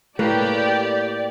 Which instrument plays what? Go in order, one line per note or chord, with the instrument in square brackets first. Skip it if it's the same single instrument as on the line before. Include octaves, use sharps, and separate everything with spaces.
[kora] A2 A#3 B4 [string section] G4 [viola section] D5